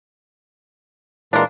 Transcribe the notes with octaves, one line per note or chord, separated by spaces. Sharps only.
A#2 E3 G#3 A#3 D4